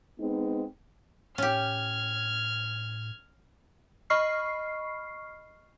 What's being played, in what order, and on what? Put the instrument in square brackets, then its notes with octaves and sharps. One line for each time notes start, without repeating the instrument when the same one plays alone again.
[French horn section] G#3 B3 C4 D#4
[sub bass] A2 [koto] C#4 G4 [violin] F6 G#6
[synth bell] D#5 B5 C#6 F6 C7